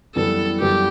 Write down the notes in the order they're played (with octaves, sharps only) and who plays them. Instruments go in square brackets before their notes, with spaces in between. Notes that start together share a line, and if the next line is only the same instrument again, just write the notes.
[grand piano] F#2 E3 G3 B3 [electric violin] A4
[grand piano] F#2 E3 G3 B3 [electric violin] G4